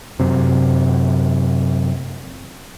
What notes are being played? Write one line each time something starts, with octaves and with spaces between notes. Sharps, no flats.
F#2 C3